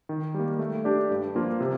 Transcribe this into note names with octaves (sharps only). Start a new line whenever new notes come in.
D#3
G3 A#3
A3
D4 G4 D5
G2
F3 A#3 D4 F4
C3